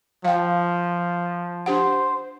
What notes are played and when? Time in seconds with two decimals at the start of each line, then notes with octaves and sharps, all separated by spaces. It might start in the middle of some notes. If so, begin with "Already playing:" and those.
0.25 F3 F5 G5
1.66 D4 G4 C5 F#5